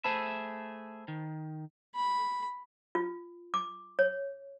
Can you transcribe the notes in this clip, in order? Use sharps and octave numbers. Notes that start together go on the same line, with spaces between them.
A3 G#4 C5 E5 A5 B5
D#3
B5
F4
D6
C#5